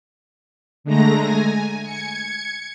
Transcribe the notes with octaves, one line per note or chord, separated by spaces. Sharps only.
D3 G#3 A3 A#5 A#6
G#5
G#6 C#7